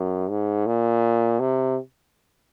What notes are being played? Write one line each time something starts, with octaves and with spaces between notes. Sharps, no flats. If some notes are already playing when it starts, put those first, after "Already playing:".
Already playing: F#2
G#2
A#2
C3